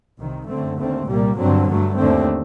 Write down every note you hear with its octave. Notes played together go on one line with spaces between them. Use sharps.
C2 C3 D#3
F#2 D3 A3 C4
D#2 D3 A3 C4
C2 A#2 G3 A#3
G2 D3 F#3 C4
G2 F#3 A3
D#2 D3 A3 C4